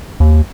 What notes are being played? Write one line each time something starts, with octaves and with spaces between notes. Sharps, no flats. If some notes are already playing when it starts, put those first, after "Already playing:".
D#2